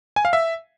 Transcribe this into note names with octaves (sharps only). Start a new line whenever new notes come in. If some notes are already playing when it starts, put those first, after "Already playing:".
G#5
F5
E5